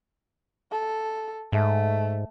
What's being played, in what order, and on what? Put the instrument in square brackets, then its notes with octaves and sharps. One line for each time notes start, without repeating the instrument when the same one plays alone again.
[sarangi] A4
[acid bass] G#2 [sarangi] A3